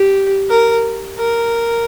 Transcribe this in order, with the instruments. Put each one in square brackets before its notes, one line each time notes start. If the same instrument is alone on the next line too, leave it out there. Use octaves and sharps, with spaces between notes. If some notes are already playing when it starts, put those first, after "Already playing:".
Already playing: [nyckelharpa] G4
A#4
A#4